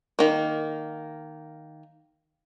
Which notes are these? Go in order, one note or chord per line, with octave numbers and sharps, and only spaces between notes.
D#3 A#3